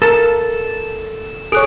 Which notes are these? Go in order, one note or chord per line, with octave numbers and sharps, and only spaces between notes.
A4 A#4 A5 E7
G#4 A4 C#5 D#6 F#6 D7